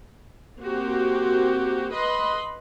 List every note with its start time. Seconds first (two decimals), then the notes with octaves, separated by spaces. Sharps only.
0.59 A#3 C4 F#4 G4
1.92 B4 D#5 B5 C6